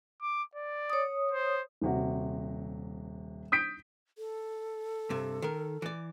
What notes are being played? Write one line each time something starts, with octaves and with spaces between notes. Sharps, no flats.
D6
D5
C#5 D#6
C5
D#1 C3 F#4
D#6 G6 B6 D7
A4
G2 C3
D#3 A#4
E3 D5